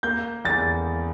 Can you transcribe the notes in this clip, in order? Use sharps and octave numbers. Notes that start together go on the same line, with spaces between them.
A#3 G6
E2 A6